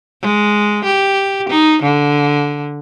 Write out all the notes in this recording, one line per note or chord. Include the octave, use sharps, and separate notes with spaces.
G#3
G4
D#4
D3